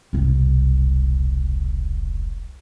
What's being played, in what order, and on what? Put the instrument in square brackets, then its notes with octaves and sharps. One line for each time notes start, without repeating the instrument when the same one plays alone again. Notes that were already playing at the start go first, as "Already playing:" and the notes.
[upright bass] E1 C2